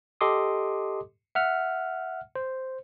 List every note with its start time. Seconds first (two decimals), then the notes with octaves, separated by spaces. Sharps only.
0.21 G4 A4 D#5 C6 D6 D#6
1.35 E5 F#5 F6
2.36 C5